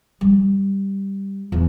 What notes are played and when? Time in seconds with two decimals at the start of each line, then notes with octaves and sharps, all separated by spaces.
0.21 G3
1.52 E2